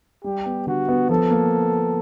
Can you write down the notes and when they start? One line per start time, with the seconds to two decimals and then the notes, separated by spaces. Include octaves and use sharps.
0.24 G3 G4
0.46 B3
0.67 D3 F#4
0.88 B3
1.09 F3 A4
1.30 A#3